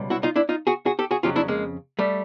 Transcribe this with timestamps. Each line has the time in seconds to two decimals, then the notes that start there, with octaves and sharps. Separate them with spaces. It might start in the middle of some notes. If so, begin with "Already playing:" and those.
Already playing: C#2 B2 G3
0.10 E4 F#4
0.23 D#4 F4
0.36 D4 E4
0.49 D#4 F4
0.67 F#4 G#4
0.86 F#4 G#4
0.99 G4 A4
1.11 F#4 G#4
1.23 F2 C#3 F#3 F4 G4
1.36 D4 E4
1.48 G#3 A#3
1.99 G3 A3